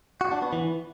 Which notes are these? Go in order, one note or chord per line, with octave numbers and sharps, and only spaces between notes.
F#4
D4
B3
E3